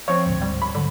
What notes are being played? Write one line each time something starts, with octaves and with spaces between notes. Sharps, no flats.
F3 C4 C#5
A1 D2 G#2
G3
B5
G#2 D3 F#3